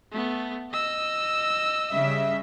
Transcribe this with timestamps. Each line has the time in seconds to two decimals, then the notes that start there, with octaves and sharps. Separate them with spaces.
0.12 A3 B3
0.72 D#5 E6
1.89 C#3 G3 E5